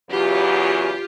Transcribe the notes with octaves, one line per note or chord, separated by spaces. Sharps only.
E2 C#3 F#3 F4 G4